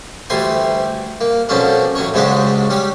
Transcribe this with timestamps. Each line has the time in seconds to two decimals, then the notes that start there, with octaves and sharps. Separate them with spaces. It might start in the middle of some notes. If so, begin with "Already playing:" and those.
0.30 D2 E3 G3 C5 G#5 C6
1.21 A#3
1.49 F2 B2 F3 F#3 C#4 D4
1.95 A1 F#3 C#4 C#5
2.14 G#2 C#3 F#3 G#3 D4 G4
2.70 G3 C#4 G4